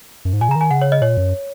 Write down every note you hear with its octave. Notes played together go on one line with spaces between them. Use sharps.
F#2
G#2
A#2 G#5
C#3 A#5
D#3
G#5
C#3 F#5
C#5
D#5
A#2 C#5
F#2